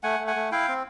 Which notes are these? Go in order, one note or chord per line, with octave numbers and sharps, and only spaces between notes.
A3 F#5 G#5
A3
F#5 G#5
A3
E4 F5 G5
C4